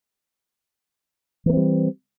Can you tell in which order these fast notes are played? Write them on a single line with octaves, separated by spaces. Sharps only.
E3 A#3 C4 G3